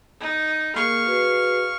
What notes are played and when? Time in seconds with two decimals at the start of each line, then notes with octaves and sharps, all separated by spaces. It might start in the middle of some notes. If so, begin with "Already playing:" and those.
0.21 D#4
0.75 A#3 G#4 A#4 F5 C#6
1.06 F#4 G#4 B4